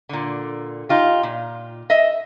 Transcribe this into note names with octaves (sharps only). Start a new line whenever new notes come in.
A#2 D3
D#4 F4 G4
A#2
D#5 E5